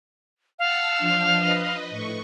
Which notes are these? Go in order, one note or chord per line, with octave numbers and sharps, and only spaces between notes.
F5 F#5 A5 E6
F3 D4 C5
B4 D#5
A2 C#6